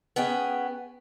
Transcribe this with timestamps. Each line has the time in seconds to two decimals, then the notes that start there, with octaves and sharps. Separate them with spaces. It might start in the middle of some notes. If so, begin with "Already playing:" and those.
0.16 B3 C#4 G#4 G5